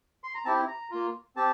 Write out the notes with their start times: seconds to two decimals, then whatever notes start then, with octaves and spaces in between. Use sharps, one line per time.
0.24 C6
0.34 A#5
0.45 C4 E4 G4 A5
0.68 A#5
0.91 A#3 F4
1.36 C4 G4 A5